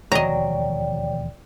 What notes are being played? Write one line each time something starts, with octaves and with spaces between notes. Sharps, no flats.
E1 D#2 F3 F#3 D5 D#5 G5 A#5